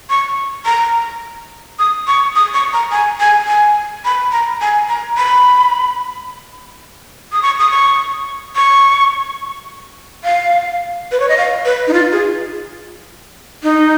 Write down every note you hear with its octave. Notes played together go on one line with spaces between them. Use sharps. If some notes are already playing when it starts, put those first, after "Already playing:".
C#6
A#5
D#6
C#6
D#6
C#6
A#5
G#5
G#5
G#5
B5
A#5
G#5
A#5
B5
D#6
C#6
D#6
C#6
C#6
F5
B4
C#5
D#5
F5
B4
D#4
F4
G#4
D#4